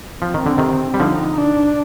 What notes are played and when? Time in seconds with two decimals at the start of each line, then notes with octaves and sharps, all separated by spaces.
0.22 F3 C4
0.34 D#3
0.46 D3
0.58 C3 D#3
0.94 G3
1.00 D3 F3 D#4
1.38 D4